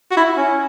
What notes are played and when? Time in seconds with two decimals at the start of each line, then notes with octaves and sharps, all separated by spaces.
0.11 F#4
0.17 E4
0.37 C#4